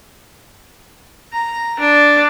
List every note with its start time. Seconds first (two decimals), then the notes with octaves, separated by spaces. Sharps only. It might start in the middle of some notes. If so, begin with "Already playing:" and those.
1.33 A#5
1.80 D4